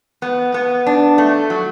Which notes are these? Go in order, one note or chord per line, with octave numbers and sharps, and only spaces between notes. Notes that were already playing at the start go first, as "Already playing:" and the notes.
B3
B3
D4
A3
F#3